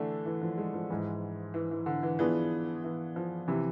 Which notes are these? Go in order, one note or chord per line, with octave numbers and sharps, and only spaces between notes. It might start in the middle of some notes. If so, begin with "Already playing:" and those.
Already playing: D3 E3 A3 D4
E3
F3
G#3
F3
G#2 E3 G#3
E3
E3
D3
E3
E3 F3 B3 D4 F4 G#4
E3
F3
C3 E3